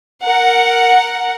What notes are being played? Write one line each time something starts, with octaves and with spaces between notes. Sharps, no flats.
A#4 F#5